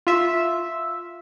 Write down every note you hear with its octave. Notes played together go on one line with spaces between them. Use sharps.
F4 E5